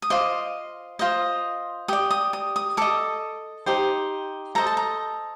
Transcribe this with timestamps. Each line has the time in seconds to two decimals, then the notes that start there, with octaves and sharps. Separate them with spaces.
0.02 D#6
0.10 F4 C5 D#5 D6
0.99 F4 C5 D#5
1.88 G4 D5 D#6
2.11 D#6
2.33 D#6
2.56 D#6
2.77 A4 D#5 D6
3.66 D#4 G4 C5
4.55 A4 C5 D#5 A#5
4.67 A5
4.77 A#5